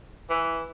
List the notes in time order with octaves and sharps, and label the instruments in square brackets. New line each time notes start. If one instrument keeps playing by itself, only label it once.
[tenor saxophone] E3